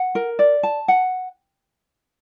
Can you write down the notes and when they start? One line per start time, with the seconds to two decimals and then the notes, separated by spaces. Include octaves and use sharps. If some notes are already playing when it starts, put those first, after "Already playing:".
Already playing: F#5
0.15 A#4
0.39 D5
0.63 A5
0.88 F#5